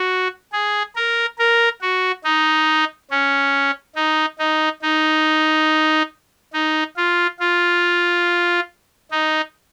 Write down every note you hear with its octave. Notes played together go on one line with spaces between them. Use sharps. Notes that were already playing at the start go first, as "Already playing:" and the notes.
Already playing: F#4
G#4
A#4
A#4
F#4
D#4
C#4
D#4
D#4
D#4
D#4
F4
F4
D#4